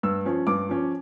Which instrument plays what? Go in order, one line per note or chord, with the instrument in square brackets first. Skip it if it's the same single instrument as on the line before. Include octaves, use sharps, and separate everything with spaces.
[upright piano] G2 E6
F3 C#4
G2 D6
F3 C#4